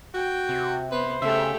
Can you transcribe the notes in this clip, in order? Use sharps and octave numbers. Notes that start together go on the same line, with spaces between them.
F#4 G5
C3
B3 B4 C5
C#3 A3 G4 E5